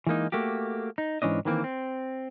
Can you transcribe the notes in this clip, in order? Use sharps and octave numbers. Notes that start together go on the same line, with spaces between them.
E3 G#3 A#3 D#4
A3 A#3 F#4 G4
D#4
G#2 E3 C#4 D4 D#5
D#3 E3 A#3 C4
C4